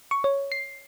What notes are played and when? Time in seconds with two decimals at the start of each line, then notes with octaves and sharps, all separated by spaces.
0.11 C#6
0.24 C#5
0.52 C7